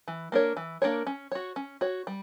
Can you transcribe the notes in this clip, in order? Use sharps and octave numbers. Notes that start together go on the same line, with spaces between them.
E3
A#3 D4 A#4 C#5
E3
A#3 D4 A#4 C#5
C#4
F#4 C#5
C#4
F#4 C#5
G3